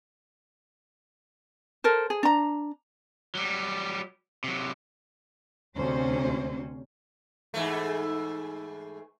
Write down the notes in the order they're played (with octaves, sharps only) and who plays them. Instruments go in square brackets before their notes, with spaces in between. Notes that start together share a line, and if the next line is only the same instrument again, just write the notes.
[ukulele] A4 A#4 C5
G#4
D4 A#5
[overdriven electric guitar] F#3 G3
C3 F#3
[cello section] D2 C3 C4 C#4 C5
[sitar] G#2 E3 A3